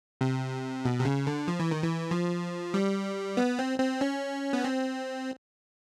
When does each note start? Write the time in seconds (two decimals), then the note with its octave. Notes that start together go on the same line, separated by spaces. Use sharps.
0.21 C3
0.85 B2
1.00 C3
1.05 C#3
1.27 D3
1.48 F3
1.60 E3
1.71 D#3
1.83 E3
2.11 F3
2.74 G3
3.37 B3
3.59 C4
3.79 C4
4.01 C#4
4.53 B3
4.64 C4